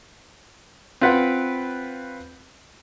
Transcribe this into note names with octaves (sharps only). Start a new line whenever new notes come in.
C4 F4 B4 F#5